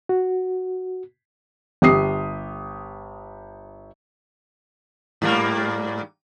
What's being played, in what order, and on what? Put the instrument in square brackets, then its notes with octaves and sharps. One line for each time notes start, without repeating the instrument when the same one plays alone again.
[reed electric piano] F#4
[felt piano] G1 G4 D#6 C7
[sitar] G#2 G3 A#3